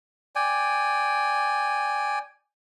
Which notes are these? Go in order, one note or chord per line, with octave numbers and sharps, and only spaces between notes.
D5 G5 G#5